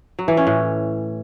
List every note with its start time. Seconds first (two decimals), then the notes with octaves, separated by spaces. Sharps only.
0.19 F#3
0.28 E3
0.37 C#4
0.47 A2